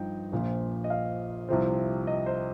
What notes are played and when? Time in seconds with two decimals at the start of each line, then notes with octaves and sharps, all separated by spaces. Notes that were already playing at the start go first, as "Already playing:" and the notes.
Already playing: G2 F3 D#4 G5
0.32 A#1 A#2 F3
0.84 D#5
0.90 F5
1.49 C2 C3 F3 C4
2.07 D#5
2.26 C5